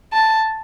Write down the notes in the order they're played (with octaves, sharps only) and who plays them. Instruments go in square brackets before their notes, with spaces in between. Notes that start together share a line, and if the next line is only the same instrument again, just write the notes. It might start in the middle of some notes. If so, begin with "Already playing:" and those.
[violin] A5